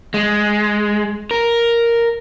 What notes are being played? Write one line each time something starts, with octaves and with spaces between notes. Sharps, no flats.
G#3
A#4